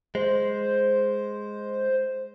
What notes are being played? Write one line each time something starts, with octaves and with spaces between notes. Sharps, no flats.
G#3 C5